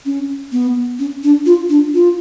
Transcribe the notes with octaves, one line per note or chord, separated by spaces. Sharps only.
C#4
B3
C#4
D4
F4
D4
F4